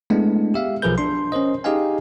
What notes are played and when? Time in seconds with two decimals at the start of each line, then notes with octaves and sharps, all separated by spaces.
0.10 G#3 A3 B3 D4 E4
0.54 G4 E5 F5
0.82 B1 F3 G#4 A#4 B4 G6
0.98 D4 C6
1.32 C#4 A#4 C5 D#5
1.64 D#4 G4 G#4 D#5 F5 G#5